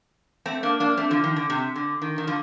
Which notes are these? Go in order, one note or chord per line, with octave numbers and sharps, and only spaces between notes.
A3 C4
A#3 D4
A#3 D4
A3 C4
D3 F3
D#3
D3
C3
D3
D#3
D#3
D3 F3